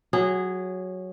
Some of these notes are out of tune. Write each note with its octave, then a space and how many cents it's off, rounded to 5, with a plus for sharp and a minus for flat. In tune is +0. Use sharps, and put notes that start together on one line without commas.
F#3 +0 G#4 -20